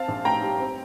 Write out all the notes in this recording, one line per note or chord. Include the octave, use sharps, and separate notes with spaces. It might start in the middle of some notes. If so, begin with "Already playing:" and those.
Already playing: C4 F5 A5
A#1
A2 G5 A#5
G3
C4